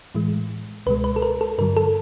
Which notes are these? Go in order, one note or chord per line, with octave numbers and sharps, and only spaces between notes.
A2 E3 G#3
C#2 B2 G#3 B4
B4
A4
A#4
A4
G2 D3 F#3 A#4
A4